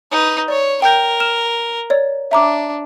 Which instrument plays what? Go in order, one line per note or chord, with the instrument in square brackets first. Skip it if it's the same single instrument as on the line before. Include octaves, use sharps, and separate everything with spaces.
[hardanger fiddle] D#4 B4
[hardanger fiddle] C#5 [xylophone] D5
[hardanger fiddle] A#4 [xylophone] G5 G6
[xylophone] F6 E7
C#5 D5
[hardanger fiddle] D4 [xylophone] E5 A#5 D6